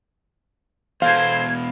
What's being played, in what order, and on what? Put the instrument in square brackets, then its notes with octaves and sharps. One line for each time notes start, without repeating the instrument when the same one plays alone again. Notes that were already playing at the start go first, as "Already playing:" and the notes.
[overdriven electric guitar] E2 B2 [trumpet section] A4 C5 [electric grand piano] F5 [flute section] G#6